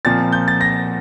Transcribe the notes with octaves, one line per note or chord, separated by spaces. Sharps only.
A#2 F3 C4 A6
G6
A6
A#6